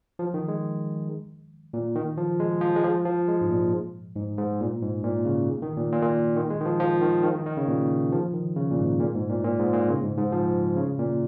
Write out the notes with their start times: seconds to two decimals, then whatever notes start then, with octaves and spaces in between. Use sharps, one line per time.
0.19 F3
0.34 D#3
0.48 G#3
1.73 A#2
1.95 D#3
2.18 F3
2.40 G#3
2.61 F3
2.76 G#3
2.84 F3
3.05 F3
3.28 G#3
3.41 G#2
3.50 A#2
4.16 G#2
4.38 G#2
4.60 A#2
4.82 G#2
5.03 A#2
5.25 C#3
5.62 D#3
5.77 A#2
5.92 A#2
6.03 A#2
6.36 D#3
6.50 G#3
6.60 D#3
6.65 F3
6.80 F3
7.02 D#3
7.24 D#3
7.35 D#3
7.46 D#3
7.57 C#3
7.68 A#2
8.12 F3
8.34 D#3
8.56 C#3
8.71 A#2
8.78 G#2
9.00 A#2
9.15 G#2
9.29 A#2
9.44 A#2
9.59 G#2
9.73 A#2
9.88 C#3
10.03 G#2
10.18 G#2
10.32 F3
10.76 C#3
10.98 A#2